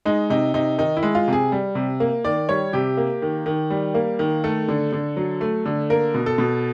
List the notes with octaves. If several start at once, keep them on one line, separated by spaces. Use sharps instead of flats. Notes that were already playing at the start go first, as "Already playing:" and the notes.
G#3 D#4
C3 D#4
C3 D#4
D#3 D#4
E4
G#3
F4
C3 G#4
G3
C3
A#3
D#3 D5
G3 C#5
C3 G4
A#3
D#3
D#3
G3
A#3
D#3
A3 A4
D3
D3
F#3
A3
D3
A#3 A#4
B2
A4
B2